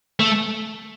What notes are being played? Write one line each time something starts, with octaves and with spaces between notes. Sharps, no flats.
A3